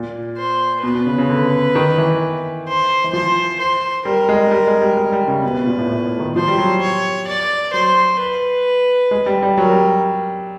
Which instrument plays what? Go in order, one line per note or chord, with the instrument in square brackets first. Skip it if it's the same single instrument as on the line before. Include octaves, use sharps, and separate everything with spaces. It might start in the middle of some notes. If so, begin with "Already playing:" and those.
Already playing: [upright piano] A#2
[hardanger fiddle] C5
[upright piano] B2 [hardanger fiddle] B4
[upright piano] B2
C#3
C#3
D3
D#3
E3
[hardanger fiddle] C5
[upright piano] E3
[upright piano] F3 [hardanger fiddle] C5
[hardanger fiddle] C5
[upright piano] G3 [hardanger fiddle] A#4
[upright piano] G#3
G3
G#3
G3
G#3
G3
C#3
C3
[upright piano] B2 [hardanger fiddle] B4
[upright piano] B2
A#2
A2
A2
A2
D#3
[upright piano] F3 [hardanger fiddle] C5
[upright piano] G3
F#3
[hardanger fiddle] C#5
D5
[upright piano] F#3 [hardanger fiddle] C5
[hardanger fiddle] B4
[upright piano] G#3
G3
G3
[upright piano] F#3 [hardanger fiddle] A#4
[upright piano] G3